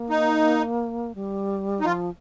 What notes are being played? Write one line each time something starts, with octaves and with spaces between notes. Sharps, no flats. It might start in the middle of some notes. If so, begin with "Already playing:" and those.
Already playing: A#3
D#4
G3
D#4
F3 F4